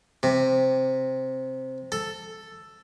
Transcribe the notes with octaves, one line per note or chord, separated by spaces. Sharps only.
C3
A4